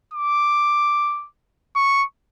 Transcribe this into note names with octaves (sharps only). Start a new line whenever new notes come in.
D6
C#6